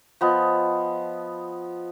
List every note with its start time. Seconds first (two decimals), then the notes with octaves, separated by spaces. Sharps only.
0.21 F3 B3 D#5